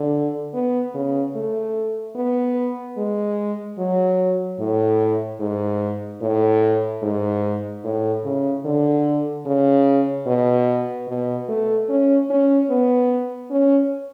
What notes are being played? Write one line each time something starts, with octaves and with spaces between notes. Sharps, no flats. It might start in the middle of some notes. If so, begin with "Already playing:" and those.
Already playing: D3
B3
C#3
A3
B3
G#3
F#3
A2
G#2
A2
G#2
A2
C#3
D3
C#3
B2
B2
A3
C#4
C#4
B3
C#4